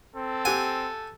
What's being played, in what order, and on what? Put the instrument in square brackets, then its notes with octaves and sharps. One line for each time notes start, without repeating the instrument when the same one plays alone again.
[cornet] C4 [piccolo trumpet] A4
[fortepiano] G4 F#5 [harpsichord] G#5